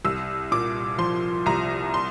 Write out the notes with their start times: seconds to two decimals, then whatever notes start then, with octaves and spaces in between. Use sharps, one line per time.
0.05 C2 E6
0.52 A#2 D6
0.98 F3 C6
1.46 C2 A#5
1.94 C6